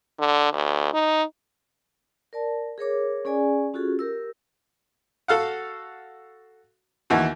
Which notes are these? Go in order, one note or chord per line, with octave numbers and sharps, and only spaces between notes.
D3
D2
D#4
A#4 D5 A5
G#4 A#4 C#5 D6
C#4 G#4 D5 G#5
C#4 F4 F#4 G#4 A4
G4 A#4 E6
F#4 A4 F5 F#5
D#2 E3 F#4